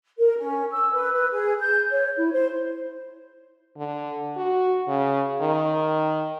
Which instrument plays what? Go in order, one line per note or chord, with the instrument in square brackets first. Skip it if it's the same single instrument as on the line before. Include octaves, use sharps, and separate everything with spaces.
[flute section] A#4
C#4
E6
B4
B4
G#4
G6
C#5
E4
C5
[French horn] D3
F#4
C#3
D#3